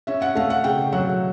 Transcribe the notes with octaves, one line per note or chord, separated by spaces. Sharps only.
C#4 E5
F#5
A3 F5
F#5
C#3 G5
F#3 F#5